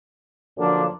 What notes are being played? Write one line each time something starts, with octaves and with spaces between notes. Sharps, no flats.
F#2 D3 F3 A#3 D4